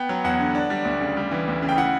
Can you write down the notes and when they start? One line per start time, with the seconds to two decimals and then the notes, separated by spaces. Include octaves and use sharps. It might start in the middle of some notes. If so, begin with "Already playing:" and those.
Already playing: B3 G5
0.09 F#3
0.24 E2 F#5
0.39 D3
0.55 D4
0.70 G3
0.85 D2
1.01 C#3
1.17 G3
1.31 E3
1.48 D2
1.62 C#3
1.69 G5
1.77 E4 F#5